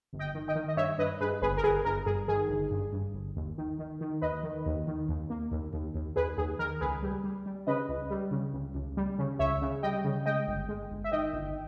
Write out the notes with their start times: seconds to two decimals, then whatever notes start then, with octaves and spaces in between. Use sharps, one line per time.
0.13 G1
0.19 D#5 G5
0.35 D#3
0.48 D#5 G5
0.55 D#3
0.68 D#5
0.77 G2 C#5 E5
0.98 G2 B4 D#5
1.21 G2 G#4 B4
1.42 G1 G#4 B4
1.57 A#4
1.63 G1 G#4 B4
1.85 G1 A#4
2.06 G2 G#4
2.28 D#3 G#4
2.49 G1
2.71 G2
2.93 G2
3.14 G1
3.36 D#2
3.58 D#3
3.79 D#3
4.01 D#3
4.22 D#2 B4 D#5
4.43 D#3
4.66 D#2
4.87 D#3
5.09 D#2
5.30 A#3
5.51 D#2
5.73 D#2
5.95 D#2
6.16 D#2 G#4 B4
6.37 D#2 G#4
6.59 D#3 A#4
6.81 C#2 G#4 B4
7.02 G3
7.24 G3
7.46 G3
7.67 C#3 B4 D#5
7.89 C#2
8.10 G3
8.31 C#3
8.53 C#2
8.74 C#2
8.97 G3
9.18 C#3
9.39 C#2 C#5 E5
9.62 C#3
9.83 G3 D#5 G5
10.04 C#3
10.26 G#3 D#5 G5
10.47 G1
10.69 G#3
10.91 G1
11.04 E5
11.12 D#3 D#5 G5
11.33 G1